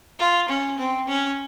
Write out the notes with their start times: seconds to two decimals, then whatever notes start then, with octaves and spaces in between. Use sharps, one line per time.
0.19 F4
0.49 C#4
0.78 C4
1.08 C#4